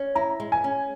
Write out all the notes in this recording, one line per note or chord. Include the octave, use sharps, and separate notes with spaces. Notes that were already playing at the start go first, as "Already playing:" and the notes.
Already playing: C#4
E4 A#5
G#3
G#5
C#4